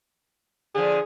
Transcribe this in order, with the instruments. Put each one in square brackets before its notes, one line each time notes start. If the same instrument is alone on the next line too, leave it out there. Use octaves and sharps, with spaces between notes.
[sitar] D3 F3 [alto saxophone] G#4